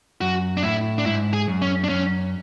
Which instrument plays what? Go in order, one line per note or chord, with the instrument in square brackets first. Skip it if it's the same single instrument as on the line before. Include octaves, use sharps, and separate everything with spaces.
[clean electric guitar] F#2 [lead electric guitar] F#4
[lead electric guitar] D4
[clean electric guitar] A2 [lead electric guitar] E4
[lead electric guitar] D4
[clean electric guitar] G#2 [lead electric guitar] E4
[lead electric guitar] G#4
[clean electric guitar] F#2
[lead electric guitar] C#4
D4
[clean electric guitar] F#2 [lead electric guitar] C#4